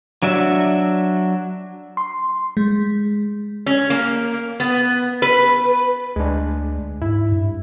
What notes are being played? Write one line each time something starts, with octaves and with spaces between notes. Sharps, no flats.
F#3 D4 F#4 E5
C6
G#3
C#4
A#3
B3
B4
D2 G#3 D4
G#2 E4
G2